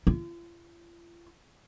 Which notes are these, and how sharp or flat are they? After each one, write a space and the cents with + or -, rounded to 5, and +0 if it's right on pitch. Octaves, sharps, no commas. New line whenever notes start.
F4 -40